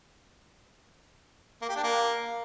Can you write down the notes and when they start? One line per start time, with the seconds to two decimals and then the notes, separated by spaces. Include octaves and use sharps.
1.62 A#3
1.69 G4
1.76 D4
1.84 A#3